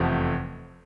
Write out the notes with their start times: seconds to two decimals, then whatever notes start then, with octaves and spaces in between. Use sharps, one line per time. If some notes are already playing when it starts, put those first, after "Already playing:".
Already playing: F1 E2 C3 F3 A3